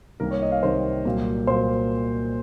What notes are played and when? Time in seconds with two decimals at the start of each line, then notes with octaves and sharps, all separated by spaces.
0.20 C2 C3 D#3 A#3 A#4
0.31 C#5
0.42 D#5
0.52 F5
0.63 C2 C3 D#3 A#3 C5
1.05 C2 A#2 F#3 A#3
1.47 A#2 F#3 A#3 C5